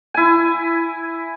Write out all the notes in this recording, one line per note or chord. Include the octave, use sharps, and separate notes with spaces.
E4 G#5